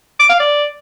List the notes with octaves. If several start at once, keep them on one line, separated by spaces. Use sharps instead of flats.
D6
F5
D5